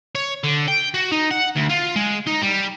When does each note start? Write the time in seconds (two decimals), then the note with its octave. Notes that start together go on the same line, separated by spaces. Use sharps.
0.15 C#5
0.44 D3
0.68 G5
0.94 F#4
1.11 D#4
1.31 F#5
1.56 D2
1.69 F4
1.96 G#3
2.27 D#4
2.43 G3